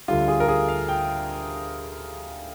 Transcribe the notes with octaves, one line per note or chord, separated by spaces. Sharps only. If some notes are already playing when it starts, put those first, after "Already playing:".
D2 D3 G3 F4
G#4
A#4
G#4
F5
G5